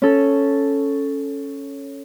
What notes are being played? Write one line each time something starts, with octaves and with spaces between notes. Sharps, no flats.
C#4 A4